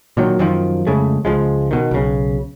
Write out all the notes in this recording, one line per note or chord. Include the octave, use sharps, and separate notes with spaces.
A#2 D#3 F#3
F#2 D#3 F3
F2 C#3 G#3 A3
C#2 F3 G#3
B2 D#3
B1 C#3